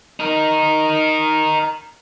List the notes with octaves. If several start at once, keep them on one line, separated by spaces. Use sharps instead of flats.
D#4 A#4